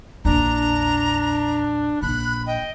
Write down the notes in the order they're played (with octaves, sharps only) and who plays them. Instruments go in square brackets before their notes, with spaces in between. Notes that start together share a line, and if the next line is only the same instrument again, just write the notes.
[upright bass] A#1 E2 [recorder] D4 [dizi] A#5
[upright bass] A#1 [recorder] B5 [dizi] F#6
[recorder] D#5 [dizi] G5